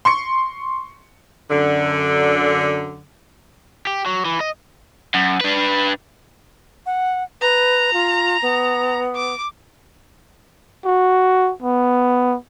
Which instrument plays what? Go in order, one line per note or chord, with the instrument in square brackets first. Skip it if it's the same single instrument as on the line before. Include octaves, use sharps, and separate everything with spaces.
[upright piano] C6 C#6 C#7
[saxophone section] F#2 D3
[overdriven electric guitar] G4
F#3
E3
D#5
F#2
D4 B4
[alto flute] F#5
[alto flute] B4 [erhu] A#5
[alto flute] F4
B3
[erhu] D6
[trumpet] F#4
B3